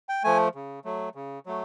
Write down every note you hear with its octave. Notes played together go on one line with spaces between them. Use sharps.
G5
F3 A3 G#5
C#3
F#3 A3
C#3
F#3 A3